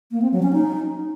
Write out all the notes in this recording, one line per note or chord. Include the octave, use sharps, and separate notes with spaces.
A#3
C4
F#3
C#4
D#4